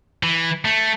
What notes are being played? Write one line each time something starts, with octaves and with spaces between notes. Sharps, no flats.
E3
A3